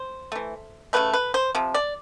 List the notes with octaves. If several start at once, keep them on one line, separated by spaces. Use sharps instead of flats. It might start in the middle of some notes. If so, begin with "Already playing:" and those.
Already playing: C5
E3 A3
C#3 F#3 A3 B4
B4
C5
C3 F3
D5